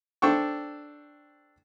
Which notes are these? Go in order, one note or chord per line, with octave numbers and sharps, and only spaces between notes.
D4 A4 C5 G5 C#6